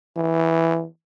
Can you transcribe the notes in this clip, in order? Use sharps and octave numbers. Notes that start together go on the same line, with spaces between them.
E3